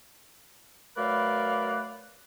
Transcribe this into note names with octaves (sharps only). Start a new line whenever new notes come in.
F#3 A3 A#4 B4 D5 F5